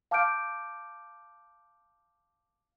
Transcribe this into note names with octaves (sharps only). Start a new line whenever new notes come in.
F5 A5 D6 F6 G6 D7